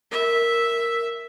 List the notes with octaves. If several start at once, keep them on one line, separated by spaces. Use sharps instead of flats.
A#4 E5